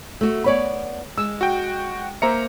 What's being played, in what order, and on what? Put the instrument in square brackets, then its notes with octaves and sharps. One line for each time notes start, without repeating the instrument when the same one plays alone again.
[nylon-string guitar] A3 F#4
[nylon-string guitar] B3 D5 [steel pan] C#5 B5
[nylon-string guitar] G#3 [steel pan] E6
[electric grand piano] F#4 G5
[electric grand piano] A#3 A#5 C#7 [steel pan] C5 E5